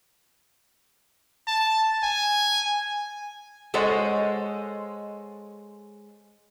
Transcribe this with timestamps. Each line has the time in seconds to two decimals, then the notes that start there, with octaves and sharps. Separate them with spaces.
1.47 A5
2.03 G#5
3.74 G#3 A4 C5 C#5 D#5 F#5